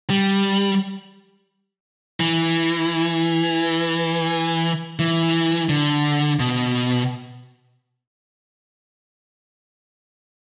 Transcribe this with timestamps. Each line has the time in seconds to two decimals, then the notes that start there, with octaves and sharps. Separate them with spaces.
0.10 G3
2.20 E3
4.99 E3
5.69 D3
6.40 B2